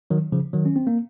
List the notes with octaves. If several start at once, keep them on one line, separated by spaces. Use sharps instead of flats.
D#3 F#3
C#3 F3
D#3 F#3
C#4
C4
A#3